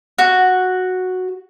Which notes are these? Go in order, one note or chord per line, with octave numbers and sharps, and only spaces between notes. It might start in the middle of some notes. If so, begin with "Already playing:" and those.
F#4